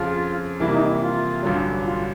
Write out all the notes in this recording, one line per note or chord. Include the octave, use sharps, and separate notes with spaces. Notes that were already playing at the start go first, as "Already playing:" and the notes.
Already playing: F2 C#3 F3 F4
C2 C3 E3 G3 A#3 E4
D#4
E4
F4
A1 G2 D3 F#3
F4